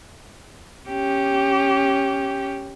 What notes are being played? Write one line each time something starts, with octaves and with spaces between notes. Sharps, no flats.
C#4 G4